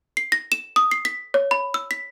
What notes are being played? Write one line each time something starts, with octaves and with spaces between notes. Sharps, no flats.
C7
A#6
E7
D#6
C7
B6
C#5
B5
E6
B6